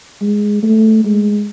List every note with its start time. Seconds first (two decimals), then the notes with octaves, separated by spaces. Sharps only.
0.21 G#3
0.63 A3
1.05 G#3